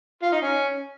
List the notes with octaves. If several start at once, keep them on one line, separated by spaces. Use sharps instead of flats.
F4
D#4
C#4